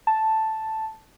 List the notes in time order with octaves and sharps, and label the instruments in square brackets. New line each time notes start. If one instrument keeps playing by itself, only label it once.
[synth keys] A5